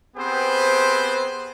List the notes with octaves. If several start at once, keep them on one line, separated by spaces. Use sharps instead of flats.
B3 C4 G4 G#4 B4 C5